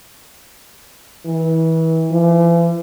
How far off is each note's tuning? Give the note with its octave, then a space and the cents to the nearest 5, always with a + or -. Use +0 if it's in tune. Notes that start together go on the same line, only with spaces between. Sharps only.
E3 -30
E3 +45